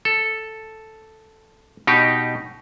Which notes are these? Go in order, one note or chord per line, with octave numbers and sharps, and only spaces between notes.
A4
B2 D#4 G4